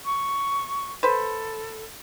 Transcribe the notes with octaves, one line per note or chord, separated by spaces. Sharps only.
C#6
A4 B4 C5 B5